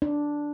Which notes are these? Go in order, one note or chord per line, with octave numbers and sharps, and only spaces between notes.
D4